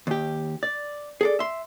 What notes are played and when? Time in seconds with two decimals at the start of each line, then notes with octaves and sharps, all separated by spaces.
0.07 D#2 G4
0.63 D5
1.21 G#4 A4 D5
1.39 E5 C6